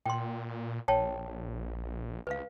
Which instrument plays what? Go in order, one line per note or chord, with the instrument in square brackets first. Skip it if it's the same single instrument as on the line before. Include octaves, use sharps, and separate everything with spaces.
[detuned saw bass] A#2 [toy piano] G5 C6
[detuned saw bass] A#1 [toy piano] C#5 G5 A5
[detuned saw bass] C#2 [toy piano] B4 F5